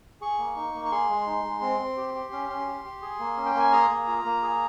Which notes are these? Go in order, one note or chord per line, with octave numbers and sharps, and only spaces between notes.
G#4 C#6
A#3
D#4
A#3
C#6
G#4 C6
G#3
D#4
G#3
C4
C4
G4
G4
C#4
C#4
G4
G4
G#4
A#3
C#4
G5
A#3 G#5
G#4 A#5
A#3
F4
A#3
G#4